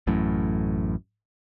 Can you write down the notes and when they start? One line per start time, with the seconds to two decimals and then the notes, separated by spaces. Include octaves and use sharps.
0.07 A1 F#2 A2